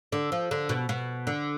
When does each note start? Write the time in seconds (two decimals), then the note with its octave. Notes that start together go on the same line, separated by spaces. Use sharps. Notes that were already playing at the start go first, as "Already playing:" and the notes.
0.12 D3
0.32 F3
0.51 D3
0.69 B2
0.89 B2
1.27 D3